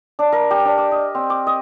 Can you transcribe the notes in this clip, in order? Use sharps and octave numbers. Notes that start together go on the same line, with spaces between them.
D4
A#4
G4
D4
D6
D#5
C4
D6
D#5